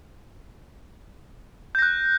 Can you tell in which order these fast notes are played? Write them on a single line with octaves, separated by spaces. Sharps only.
G6 A#6 F#6